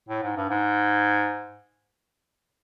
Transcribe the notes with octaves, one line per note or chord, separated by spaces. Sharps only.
A2
G#2
G2
G#2